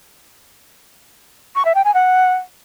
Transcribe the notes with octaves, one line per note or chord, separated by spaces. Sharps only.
C#6
E5
G5
G#5
F#5